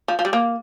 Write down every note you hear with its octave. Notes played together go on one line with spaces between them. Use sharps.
F3
F3
G3
A#3